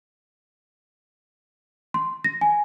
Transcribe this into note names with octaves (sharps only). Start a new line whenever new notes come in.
C6
A#6
G#5